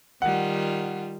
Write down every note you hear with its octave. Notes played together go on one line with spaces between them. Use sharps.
D#3 G3 F4 F#5